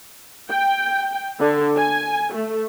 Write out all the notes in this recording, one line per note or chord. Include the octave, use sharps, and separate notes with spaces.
G5
D3
G#5
A3